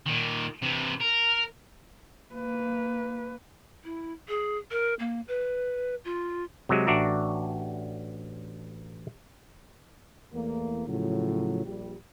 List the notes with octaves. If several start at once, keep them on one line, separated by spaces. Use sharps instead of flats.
A#2 D#3
C3 E3
A#4
A#3 B4
E4
G#4
A#4
A#3
B4
F4
C3 F#3 G#3
A1 D4 F#4 D5 E5 A#5
E2 A3 A#3
A2 C#3 F3 F#3
A#1 G3